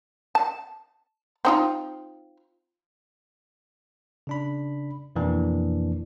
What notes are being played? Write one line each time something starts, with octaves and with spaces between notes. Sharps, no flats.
A5
C4 D#4 F4
C#3 D4 B5
F2 B2 E3 A#3 D4